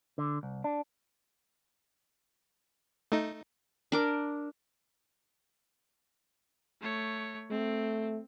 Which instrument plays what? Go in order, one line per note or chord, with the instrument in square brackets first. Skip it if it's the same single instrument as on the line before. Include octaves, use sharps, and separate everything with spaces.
[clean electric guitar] D3
C2
D4
[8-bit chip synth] A3 D#4
[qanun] D4 A#4 D6
[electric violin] A3 C#5
[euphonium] A3 [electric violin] C4